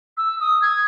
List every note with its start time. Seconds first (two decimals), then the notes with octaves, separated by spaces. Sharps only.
0.17 E6
0.41 D#6
0.62 G#6